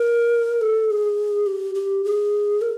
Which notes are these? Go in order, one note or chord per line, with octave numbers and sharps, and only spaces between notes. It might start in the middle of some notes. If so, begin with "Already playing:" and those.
Already playing: A#4
A4
G#4
G4
G4
G#4
A#4